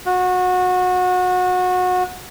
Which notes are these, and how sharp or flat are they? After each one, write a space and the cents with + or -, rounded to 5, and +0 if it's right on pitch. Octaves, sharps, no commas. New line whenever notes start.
F#4 -25